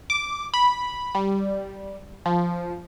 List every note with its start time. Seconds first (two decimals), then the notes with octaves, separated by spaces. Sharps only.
0.10 D6
0.54 B5
1.15 G3
2.26 F3